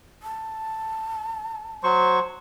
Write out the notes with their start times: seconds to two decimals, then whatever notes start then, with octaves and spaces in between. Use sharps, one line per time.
0.23 A5
1.83 F#3 C5 C#6